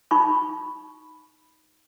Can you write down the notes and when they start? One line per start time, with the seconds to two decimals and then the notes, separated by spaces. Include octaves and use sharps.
0.11 D#4 B5 C#6